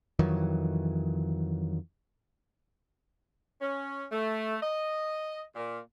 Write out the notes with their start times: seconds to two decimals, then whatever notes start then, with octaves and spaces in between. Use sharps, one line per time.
0.19 F2 D#3 E3 F#3
3.61 C#4
4.12 A3
4.61 D#5
5.55 A#2